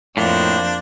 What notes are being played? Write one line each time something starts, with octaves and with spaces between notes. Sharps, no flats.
F2 A2 F3 A#3 D4 C5